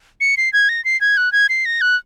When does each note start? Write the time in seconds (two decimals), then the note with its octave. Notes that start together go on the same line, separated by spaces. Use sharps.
0.21 C#7
0.37 C7
0.53 G#6
0.69 A#6
0.85 C7
1.01 G#6
1.17 F#6
1.32 G#6
1.49 C7
1.65 A#6
1.81 F#6